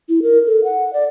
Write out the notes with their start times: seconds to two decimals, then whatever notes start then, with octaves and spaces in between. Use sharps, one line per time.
0.09 E4
0.22 A#4
0.47 A4
0.64 F#5
0.93 D5